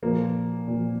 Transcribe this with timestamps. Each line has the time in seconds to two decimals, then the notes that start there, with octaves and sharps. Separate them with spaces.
0.02 A#2 F3 A#3
0.68 A#2 F3